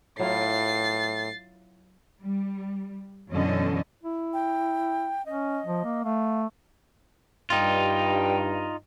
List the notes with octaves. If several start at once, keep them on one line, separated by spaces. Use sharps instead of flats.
A2 F#3 E4 F4 A6 C7
G3
F#2 B2 D3 E3 C#4 D#5
E4
G5
C#4 D#5
F3
A#3
A3 F5
G2 D#4 F4 G5